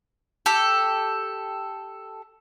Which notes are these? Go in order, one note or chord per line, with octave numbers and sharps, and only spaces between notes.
G4 A4